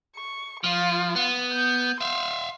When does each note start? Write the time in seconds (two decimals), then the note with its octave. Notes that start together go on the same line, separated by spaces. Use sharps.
0.16 C#6
0.64 F3 F4
1.16 B3
1.52 G6
2.01 E5 F5 C6